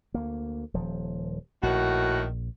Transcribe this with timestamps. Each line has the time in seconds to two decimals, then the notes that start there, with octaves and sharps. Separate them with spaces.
0.14 D2 A#3
0.74 D#1 F3
1.63 A#1 A2 D#3 F#4